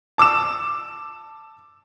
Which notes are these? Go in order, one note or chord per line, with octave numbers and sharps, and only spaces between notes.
A5 D6 E6 E7